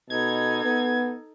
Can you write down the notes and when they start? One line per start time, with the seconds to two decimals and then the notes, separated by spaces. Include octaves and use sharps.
0.10 B2 D#4 A4 G#6
0.64 B3